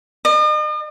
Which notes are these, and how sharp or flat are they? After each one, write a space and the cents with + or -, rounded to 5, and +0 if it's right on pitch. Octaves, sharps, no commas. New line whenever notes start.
D#5 -45